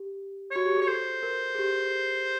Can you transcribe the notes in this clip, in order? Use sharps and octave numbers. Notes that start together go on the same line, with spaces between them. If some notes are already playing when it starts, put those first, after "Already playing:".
Already playing: G4
F#4 C#5
G4
G#4 C#5
A4 C5
A#4
G#4
G4